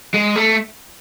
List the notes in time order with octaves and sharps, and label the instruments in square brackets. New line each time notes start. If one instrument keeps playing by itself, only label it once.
[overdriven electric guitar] G#3
A3